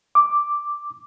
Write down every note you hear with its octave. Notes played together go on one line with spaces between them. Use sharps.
D6